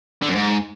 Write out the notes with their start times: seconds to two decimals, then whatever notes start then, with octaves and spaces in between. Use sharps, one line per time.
0.22 D3
0.29 F#2
0.35 G#2